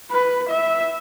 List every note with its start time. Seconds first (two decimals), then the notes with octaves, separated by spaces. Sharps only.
0.11 B4
0.50 E5